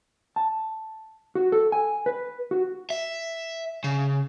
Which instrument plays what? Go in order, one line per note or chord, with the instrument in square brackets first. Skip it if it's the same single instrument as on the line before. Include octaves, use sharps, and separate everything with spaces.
[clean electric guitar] A5
F#4
A4
G#5
B4
F#4
[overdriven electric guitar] E5
C#3